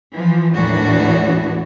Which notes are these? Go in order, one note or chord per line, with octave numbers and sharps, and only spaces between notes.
E3 F3
D#2 A2 E3 D4 F#4